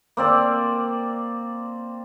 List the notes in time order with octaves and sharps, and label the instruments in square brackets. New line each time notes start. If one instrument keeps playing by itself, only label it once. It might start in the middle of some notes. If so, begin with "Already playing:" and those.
[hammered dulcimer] A#3 C4 D5